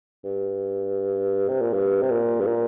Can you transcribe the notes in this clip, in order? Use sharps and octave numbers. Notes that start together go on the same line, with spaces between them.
G2
C3
A#2
G2
C3
A#2
G2
A#2